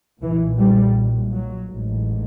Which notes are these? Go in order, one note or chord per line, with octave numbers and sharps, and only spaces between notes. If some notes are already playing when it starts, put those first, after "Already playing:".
B1 A#2 E3
G3
F#3
A1 G#2